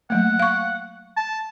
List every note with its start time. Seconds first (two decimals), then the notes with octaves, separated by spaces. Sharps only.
0.10 F#3 A3 A#3 F#5
0.39 F5 C#6
1.17 A5